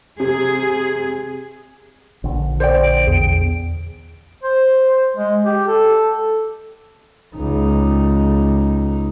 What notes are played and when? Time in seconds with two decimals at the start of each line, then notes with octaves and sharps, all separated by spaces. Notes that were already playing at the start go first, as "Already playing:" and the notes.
0.20 C3 G#4
2.24 A#1 D3
2.60 C5 D5 G5
2.83 D7
3.07 E2 G#4
4.43 C5
5.17 G#3
5.45 G4
5.67 A4
7.36 C#2 D#4